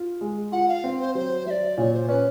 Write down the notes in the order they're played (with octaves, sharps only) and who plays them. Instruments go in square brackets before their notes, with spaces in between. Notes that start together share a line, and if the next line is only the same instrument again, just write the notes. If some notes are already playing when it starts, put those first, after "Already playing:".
Already playing: [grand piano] F4
G#3
[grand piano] F4 [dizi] F#5
[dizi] F5
[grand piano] C4
[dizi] C5
[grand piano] F#3 [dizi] C5
[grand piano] F#3 [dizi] E5
[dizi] D5
[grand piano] A#2 [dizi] C#5
[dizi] C5
[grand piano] C#4 [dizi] B4